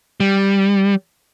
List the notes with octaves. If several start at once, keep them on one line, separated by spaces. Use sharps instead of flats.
G3